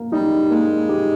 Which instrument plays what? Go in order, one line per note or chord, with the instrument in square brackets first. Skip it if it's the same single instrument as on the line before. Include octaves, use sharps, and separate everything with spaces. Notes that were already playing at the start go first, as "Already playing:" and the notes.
Already playing: [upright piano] A#3
[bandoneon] G3 [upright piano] D#4 G4
[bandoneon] G#3 [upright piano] A#3
[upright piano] D#4 G4